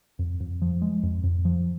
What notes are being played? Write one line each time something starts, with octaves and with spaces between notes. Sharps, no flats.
F2
F2
F3
G#3
F2
F2
F3